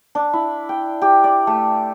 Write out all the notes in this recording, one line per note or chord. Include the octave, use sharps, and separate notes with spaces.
D4
E4
G5
G4
D5
A3